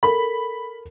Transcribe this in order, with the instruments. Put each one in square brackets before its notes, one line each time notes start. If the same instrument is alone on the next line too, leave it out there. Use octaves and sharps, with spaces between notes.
[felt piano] A4 A#4 [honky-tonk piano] B5